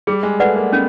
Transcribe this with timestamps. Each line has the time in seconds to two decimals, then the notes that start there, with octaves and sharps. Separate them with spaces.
0.07 G3 G#4
0.23 G#3
0.40 A3 B4 D5 F#5
0.56 A#3
0.72 B3 C#4